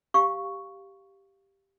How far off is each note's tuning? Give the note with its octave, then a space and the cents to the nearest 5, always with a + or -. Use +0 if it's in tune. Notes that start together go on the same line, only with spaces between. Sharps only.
G4 +0 F5 +0 C#6 +0